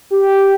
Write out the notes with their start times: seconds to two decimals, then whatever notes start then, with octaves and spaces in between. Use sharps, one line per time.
0.11 G4